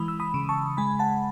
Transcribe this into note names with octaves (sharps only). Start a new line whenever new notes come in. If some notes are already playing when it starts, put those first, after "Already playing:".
Already playing: E3 G#3 B5 D#6
E6
B5 D#6
C#3
A5 C#6
G#3 G#5 B5
F#5 A5